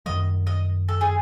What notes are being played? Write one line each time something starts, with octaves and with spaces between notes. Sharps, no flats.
F#2 D#3 G3 D#5
D#5
A4
G#4